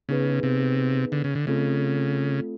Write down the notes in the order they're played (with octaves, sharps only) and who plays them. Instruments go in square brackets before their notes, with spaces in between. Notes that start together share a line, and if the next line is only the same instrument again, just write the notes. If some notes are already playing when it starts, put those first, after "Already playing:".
[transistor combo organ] C#3 [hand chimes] B3 D#4 G#4 B4
[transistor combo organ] C3
D3
C#3
D3
[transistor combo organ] C#3 [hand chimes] A3 C4 F4 A4